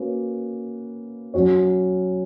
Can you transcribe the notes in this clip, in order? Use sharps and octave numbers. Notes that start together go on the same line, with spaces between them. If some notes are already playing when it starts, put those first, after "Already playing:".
Already playing: A#3 C#4 F#4 B4
F#3 C#4 F#4 C#5